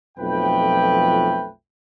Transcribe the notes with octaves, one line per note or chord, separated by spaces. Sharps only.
B1 F2 F3 A3 B4 G5